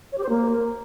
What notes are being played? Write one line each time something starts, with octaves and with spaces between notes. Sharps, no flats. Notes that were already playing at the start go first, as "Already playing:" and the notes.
C#5
G4
C5
A#3